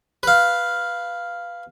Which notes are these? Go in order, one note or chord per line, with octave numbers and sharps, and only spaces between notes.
B4 F5